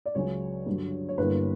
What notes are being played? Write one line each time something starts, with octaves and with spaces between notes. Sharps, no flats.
D5
C#2 C#3 F#3 C#4 C#5
G2 D3 F#3
C#5
G1 G2 D3 A#3 E4 B4